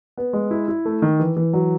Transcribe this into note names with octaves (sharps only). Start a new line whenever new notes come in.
B3
G#3
E4
E4
A3
D#3
E3
E3
F#3